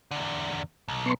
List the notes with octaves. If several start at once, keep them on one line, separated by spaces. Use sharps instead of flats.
E2 D3
B1
B3 C6 C#6